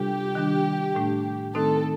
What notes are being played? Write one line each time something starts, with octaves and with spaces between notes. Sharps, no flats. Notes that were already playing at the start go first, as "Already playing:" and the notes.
Already playing: C3 G3 D4 F4 G4 A4
D#3 G3 D4
A2 A3 D4
D#3 A3 C4 D#4 A4